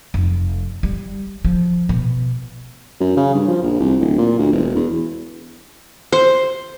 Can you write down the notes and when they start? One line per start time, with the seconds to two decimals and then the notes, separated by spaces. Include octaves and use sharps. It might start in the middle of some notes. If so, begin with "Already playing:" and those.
0.14 F1
0.83 G3
1.44 F3
1.89 B2
3.01 F#2
3.17 C#3
3.35 G2
3.48 F3
3.63 A#1
3.80 C2
4.00 D1
4.18 A#2
4.39 D2
4.52 E1
4.76 E2
6.12 C5